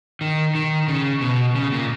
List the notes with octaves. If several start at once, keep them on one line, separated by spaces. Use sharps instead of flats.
D#3
D#3
C#3
B2
C#3
A#2